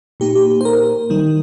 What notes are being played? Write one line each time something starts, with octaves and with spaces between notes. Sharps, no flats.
A#2 A#3 D#4 G4
G4
C5
A#4
D#3 G3 D#4